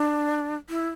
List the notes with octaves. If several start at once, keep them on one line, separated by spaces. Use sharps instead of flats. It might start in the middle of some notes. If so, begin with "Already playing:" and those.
Already playing: D4
E4